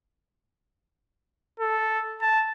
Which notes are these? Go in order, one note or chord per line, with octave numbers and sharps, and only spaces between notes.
A4
A5